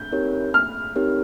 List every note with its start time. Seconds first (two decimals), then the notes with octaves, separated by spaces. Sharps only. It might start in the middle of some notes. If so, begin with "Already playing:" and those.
Already playing: G6
0.12 C4 D#4 G4 A#4 C#5
0.54 F6
0.96 C4 D#4 G4 A#4 C#5